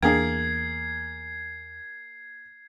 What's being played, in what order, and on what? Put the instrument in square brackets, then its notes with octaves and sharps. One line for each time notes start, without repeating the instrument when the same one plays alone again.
[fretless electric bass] E2 [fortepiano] A#3 G#4 [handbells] D4 G5 [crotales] G#6 C7